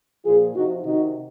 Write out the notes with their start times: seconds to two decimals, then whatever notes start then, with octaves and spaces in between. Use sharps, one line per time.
0.24 A#2 F3 F4 G#4
0.54 C3 F3 D#4 F#4
0.84 C3 D#3 D#4 F#4